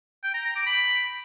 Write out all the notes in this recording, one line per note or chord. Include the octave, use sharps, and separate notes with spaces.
G5
A#5
A#5
D6
B5